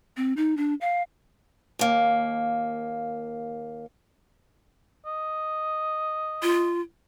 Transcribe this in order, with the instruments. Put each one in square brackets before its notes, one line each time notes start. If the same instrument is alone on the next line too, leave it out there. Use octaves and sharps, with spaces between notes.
[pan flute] C4
D#4
D4
F5
[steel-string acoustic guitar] D#2 A#3
[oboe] D#5
[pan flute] F4